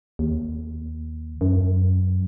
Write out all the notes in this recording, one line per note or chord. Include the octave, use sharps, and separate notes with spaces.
D#2
F#2